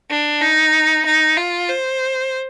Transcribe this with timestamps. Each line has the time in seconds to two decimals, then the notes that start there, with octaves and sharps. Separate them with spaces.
0.10 D4
0.42 D#4
1.06 D#4
1.37 F4
1.69 C5